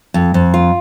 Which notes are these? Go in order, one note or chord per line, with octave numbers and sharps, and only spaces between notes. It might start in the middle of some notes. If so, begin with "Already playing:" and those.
F2
F2
F4